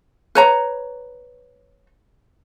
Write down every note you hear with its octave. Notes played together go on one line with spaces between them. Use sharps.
B4 C#5 A#5